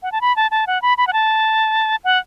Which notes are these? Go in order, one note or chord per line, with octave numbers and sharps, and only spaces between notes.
F#5
A5
B5
A5
A5
F#5
B5
B5
F#5
A5
F#5